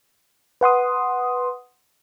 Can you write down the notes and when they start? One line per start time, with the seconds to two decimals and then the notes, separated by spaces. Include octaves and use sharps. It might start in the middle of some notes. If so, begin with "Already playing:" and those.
0.61 B4 F#5 C6 D#6